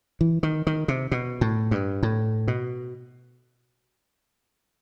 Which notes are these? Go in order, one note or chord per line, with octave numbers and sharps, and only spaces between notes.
E3
D#3
D#3
C3
B2
A2
G2
A2
B2